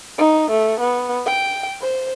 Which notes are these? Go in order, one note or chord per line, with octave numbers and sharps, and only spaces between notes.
D#4
A3
B3
G5
C5